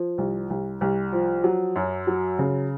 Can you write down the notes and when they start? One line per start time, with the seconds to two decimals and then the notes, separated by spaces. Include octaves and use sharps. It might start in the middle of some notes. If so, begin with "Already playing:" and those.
Already playing: F3
0.18 C2
0.50 C2
0.81 C2
1.12 F3
1.44 F#3
1.76 F#2
2.07 F#3
2.39 C#3